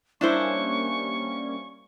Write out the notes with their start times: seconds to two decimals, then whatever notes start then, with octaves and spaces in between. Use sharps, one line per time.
0.21 G3 A#3 C#4 D4 E4 C5 C#6